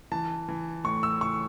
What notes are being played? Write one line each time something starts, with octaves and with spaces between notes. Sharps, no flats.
E3 A5
E3
A2 C#6
E6
E3 C#6